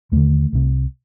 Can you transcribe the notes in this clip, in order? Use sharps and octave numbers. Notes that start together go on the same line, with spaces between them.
D#2 D3 A3
C2 C3